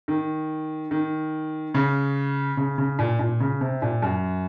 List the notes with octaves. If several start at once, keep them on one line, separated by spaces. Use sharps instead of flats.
D#3
D#3
C#3
C#3
C#3
A#2
A#2
C#3
C3
A#2
F#2